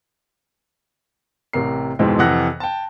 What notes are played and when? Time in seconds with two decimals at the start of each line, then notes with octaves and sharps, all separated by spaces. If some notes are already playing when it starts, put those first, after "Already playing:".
1.53 A1 C3 A#4 C7
1.99 F2 G#2 B2 E3 G#3 C4
2.19 F2 C3 E3 F#5 F#6 A#6
2.60 G5 A5